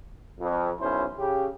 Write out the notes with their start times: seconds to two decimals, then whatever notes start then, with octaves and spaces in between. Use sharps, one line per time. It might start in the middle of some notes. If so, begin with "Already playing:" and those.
0.40 F2
0.80 B1 C#4 E4 C5
1.18 C#3 G4